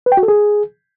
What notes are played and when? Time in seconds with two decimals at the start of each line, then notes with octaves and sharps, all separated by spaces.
0.06 B4
0.12 G5
0.17 F#4
0.23 A4
0.28 G#4